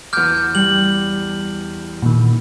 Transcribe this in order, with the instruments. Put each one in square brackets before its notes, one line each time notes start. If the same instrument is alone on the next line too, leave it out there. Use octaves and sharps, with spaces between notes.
[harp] E2 D6 [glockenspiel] F6 G6
[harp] G3 [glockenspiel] F#7
[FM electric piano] A#2 D#3